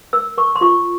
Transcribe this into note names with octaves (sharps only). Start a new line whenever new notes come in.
A#4 E6
A#4 C#6
C6
F4 C#6